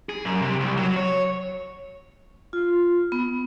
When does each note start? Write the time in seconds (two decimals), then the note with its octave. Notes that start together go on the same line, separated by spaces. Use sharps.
0.09 G#4
0.25 F#2
0.42 C3
0.60 C2
0.77 F#3
0.96 C#5
2.53 F4
3.12 B3